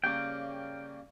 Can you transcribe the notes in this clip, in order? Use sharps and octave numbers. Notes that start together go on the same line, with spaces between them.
C#3 G3 A#3 G5